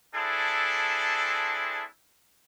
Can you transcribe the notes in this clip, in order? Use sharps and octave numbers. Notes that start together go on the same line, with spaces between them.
C4 D4 E4 G#4 A4